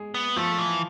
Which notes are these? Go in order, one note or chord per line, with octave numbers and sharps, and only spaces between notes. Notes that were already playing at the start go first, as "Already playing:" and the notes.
Already playing: G#3 G#4
B3
F3 A3
E3